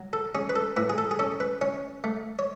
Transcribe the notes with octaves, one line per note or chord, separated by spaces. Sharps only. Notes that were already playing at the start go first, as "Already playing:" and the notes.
Already playing: F#3
A4
C#4 G#4
B4
A4
A2 B4
G#4
A4
G#4
C#4 A4
B4
C#4 C#5
A3
C#5